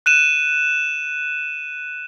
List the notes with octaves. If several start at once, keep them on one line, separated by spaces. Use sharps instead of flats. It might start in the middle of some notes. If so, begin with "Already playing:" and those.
F#6 D#7 E7